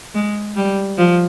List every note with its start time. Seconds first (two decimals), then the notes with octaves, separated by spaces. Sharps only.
0.15 G#3
0.56 G3
0.98 F3